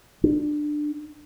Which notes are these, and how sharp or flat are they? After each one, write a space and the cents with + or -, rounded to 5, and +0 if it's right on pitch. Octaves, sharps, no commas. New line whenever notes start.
D4 +20